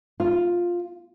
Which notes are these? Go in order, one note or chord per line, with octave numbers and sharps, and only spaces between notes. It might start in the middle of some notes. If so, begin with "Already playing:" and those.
F4